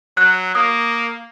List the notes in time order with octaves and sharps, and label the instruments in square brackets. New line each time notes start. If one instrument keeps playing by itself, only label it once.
[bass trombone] F#3 [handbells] F#6
[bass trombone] A#3 [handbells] D#6